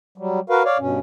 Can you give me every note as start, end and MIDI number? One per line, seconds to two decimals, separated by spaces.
0.18 0.40 54
0.18 0.40 55
0.50 0.63 66
0.50 0.63 70
0.50 0.63 71
0.50 0.63 77
0.65 0.78 73
0.65 0.78 74
0.65 0.78 77
0.79 0.99 43
0.79 0.99 47
0.79 0.99 61